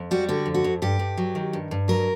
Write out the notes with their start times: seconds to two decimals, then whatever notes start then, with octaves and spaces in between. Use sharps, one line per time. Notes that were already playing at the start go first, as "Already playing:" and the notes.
Already playing: F2
0.11 G3 F#4
0.29 D3 F#4
0.46 F2
0.54 F#4
0.64 F2
0.82 G2 G4
0.99 G2
1.17 F#3
1.35 D#3
1.53 G2
1.71 G2
1.88 F#3 A#4